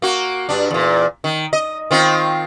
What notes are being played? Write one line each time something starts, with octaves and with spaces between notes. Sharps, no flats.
A#3 F#4
G2 D4
E2 A#2
D#3
D#5
D#3 C4 F4